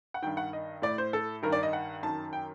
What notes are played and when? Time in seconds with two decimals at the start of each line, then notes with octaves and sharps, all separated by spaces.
0.14 F#5
0.22 G2 D#3 G5
0.37 F#5
0.53 D#5
0.82 A2 D5
0.98 C5
1.13 A4
1.43 G2 D#3 A#4
1.52 D5
1.63 D#5
1.73 F#5
2.03 F#2 D#3 A5
2.33 G5